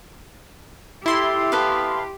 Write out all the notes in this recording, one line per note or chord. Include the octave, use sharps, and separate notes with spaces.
E4 G4 A4 C6
B3 A4 B4 F5